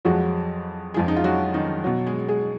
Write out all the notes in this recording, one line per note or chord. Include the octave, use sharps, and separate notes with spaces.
F2 F3 F#3 G#3 F#4
F2 F3 G#3 G#4
D#4
F4
F#3 F#4
D#3 D#4
B2 F#3
G#3 G#4
G#3 G#4